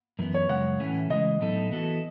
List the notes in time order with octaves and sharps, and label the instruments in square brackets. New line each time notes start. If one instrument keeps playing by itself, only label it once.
[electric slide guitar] F#2 E3 B3
[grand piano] C#5
[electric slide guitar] F#2 C#3 G#3 [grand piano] F#5
[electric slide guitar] A2 E3 A3 C#4
[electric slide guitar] C#3 E3 G#3 [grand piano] D#5
[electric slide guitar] A2 F#3 B3 D#4 A4
E3 B3 F#4 A4